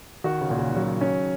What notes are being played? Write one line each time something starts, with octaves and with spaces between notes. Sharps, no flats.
D#3 F#4
C#3
A#2
C#3
D#3
C#3 F#3
C#4